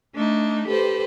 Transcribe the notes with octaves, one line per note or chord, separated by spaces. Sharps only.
A3 D4 D#4
G4 A4 B4 C5